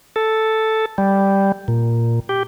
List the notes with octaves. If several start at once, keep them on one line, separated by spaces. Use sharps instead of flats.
A4
G3
A#2
G4